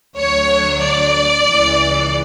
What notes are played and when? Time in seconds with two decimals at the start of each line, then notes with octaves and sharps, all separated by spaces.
0.17 D2 D3 F#3 C#5
0.81 D5
1.45 C#2 C#3 E3